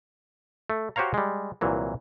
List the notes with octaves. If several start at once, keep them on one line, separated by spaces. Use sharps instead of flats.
A3
F#4 G4 C5 C#5 F5 A#5
G3 G#3
C2 A#2 E3 F#3